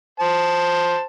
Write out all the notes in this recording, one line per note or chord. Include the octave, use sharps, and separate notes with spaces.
C5 A5